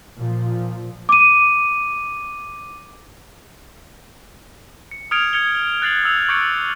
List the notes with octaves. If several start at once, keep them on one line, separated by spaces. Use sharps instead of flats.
A#2 F3
D6 D#7
C#7
D#6 F6 G#6 C#7 D7 F7
G#6 C#7 F7 G7
F#6 A6 C7 F#7
D#6 E6 F7
C#6 D6 G6 A6 C#7 D7